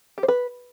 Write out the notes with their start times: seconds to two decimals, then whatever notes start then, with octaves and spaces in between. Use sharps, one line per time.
0.18 G4
0.23 C5
0.28 B4